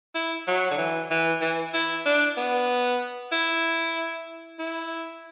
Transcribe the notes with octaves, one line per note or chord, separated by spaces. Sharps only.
E4
F#3
D3
E3
E3
E3
E4
D4
B3
E4
E4